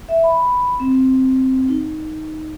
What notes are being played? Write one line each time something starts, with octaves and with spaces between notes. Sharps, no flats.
E5
B5
C4
D#4